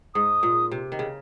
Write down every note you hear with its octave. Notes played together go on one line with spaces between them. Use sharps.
G#2 D#6
A#2
C3
D#3
C#3